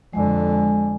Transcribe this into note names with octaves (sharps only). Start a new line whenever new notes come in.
F2 D3 G#3 G#5